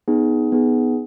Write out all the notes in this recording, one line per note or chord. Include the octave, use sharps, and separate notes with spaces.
B3 D#4 G#4
B3 D#4 G#4